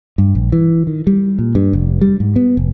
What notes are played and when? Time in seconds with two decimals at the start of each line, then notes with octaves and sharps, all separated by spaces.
0.18 G2
0.35 A#1
0.52 E3
0.87 D#3
1.07 G3
1.39 A#2
1.55 G2
1.73 F1
2.01 G3
2.20 G#2
2.36 B3
2.57 F1